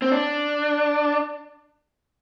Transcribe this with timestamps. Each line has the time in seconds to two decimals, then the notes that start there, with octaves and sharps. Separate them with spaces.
0.02 C4
0.12 D4